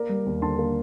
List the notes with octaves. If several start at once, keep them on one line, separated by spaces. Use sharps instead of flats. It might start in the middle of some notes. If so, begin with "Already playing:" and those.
Already playing: A#3 A#4 D5
G3
D#2
D3 A5 C6
A#3